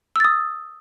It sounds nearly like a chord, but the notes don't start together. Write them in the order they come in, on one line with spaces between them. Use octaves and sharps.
E6 A6 D#6